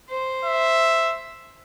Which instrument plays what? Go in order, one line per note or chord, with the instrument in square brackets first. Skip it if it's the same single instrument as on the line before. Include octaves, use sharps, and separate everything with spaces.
[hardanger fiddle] C5
[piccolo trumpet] E5